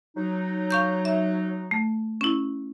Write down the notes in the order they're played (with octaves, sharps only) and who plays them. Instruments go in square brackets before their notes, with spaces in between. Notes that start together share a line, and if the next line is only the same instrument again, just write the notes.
[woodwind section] F#3 D#4
[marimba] F5 C#6 G6
E5
A3
C#4 E4